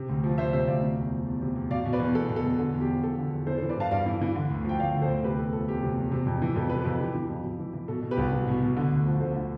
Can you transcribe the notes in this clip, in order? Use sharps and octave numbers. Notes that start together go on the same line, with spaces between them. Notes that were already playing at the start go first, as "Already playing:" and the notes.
Already playing: C3
D2
F3
D2 C5 E5
C3 C5 E5
D2 D5 F5
C3
E2
F3
E2
C3
E2
B2 D5 F5
B2
B4 D5
E2
E2 A4
B2
A4
B2
D3 A4
E2
G4
F3
E2 A4
D3
E2
E3 A4 C5
E3 A4 C5
B4 D5
G2 F5 A5
G2 D5 F5
E3
E3
D3
D2
F3 G5
D2 D5 F5
D3
A4 C5
D2
C3 G4 B4
E2 A4
F3 A4
E2 G4
C3
E2
C3
F2
E3
F2 A4
C3 B4
A4
F2
E3 G4
E3
F2
F2
E3
E3
B2 A4
B2
G4 B4
C2
C2
B2
B2
D3
D2
F3
D2 A4 C5
D3